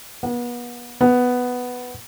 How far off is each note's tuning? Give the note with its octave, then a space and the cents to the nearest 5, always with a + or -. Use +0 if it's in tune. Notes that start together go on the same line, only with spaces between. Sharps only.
B3 -35
B3 +5